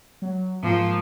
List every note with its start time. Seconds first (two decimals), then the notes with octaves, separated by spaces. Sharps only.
0.22 F#3
0.63 G#2 F3 A#3